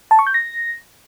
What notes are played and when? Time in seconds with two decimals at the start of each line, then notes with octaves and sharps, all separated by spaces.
0.11 A5
0.19 C#6
0.27 G6
0.34 A#6